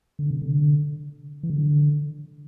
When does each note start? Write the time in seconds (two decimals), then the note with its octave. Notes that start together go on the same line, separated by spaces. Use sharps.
0.19 D3
0.31 C3
0.42 D3
1.43 E3
1.50 D3